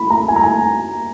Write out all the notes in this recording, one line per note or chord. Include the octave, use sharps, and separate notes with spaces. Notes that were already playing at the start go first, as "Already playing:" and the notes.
Already playing: B5
A#5
G#5
A#5
G#5